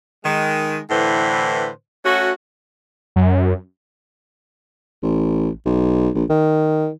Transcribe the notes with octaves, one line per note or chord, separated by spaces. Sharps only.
D#3 G#3
A2 D3 E3 B4 C5
A3 C#4 F#4
F#2
A1
B1
A#1
D#3